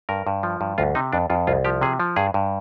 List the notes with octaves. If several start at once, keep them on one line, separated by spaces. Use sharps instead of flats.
G2 A#4
G2
F3
G2
D2 F4
C3 D#4
F2 D4
F2 F4
C2 F4
F3 G4
C3 G#4
F3
G2 G#4
G2